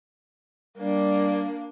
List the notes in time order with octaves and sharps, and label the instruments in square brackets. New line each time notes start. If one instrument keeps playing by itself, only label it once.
[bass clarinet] G3 [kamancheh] A#3 D4